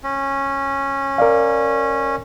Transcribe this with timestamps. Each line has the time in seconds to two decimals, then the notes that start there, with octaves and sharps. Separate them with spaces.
0.04 C#4
1.18 A#4 D5 F5